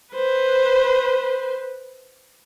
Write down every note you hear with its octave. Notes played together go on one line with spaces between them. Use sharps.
B4 C5